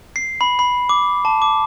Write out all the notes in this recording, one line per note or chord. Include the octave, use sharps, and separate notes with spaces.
C7
B5
B5
D6
A5
D6